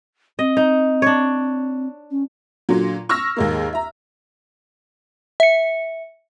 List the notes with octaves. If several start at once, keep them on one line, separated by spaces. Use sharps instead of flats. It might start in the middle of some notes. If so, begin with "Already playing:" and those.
C4 D#5
D#4
D4 C#5
C#4
A#2 D3 F#3
C#6 E6 F6 A#6
D#2 G#2 A#3
E5 A#5
E5 C#7